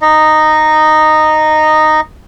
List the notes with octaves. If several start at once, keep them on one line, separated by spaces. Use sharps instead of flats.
D#4 D#5